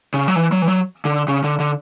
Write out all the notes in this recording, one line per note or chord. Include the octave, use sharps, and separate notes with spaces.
C#3
F#3
E3
F#3
E3
F#3
D3
C#3
D3
D3